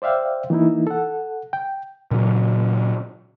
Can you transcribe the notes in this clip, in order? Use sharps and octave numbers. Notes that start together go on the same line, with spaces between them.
C5 D5 E5 F5 G5
E3 A#3 D#4 E4
A4 F#5
G5
A#2 C#3 F#3